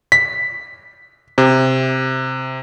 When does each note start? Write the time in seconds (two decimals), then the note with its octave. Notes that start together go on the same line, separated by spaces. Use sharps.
0.12 B6
1.38 C3